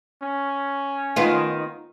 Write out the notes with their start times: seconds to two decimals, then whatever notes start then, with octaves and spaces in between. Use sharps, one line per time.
0.22 C#4
1.16 D#3 B3 F4